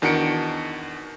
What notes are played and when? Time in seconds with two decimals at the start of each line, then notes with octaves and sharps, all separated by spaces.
0.02 E2 D#3 D4 F#4 C#7 D7